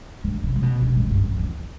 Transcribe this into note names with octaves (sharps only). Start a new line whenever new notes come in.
D3
C3
C3
B2
B2
A2
G2
F2
E2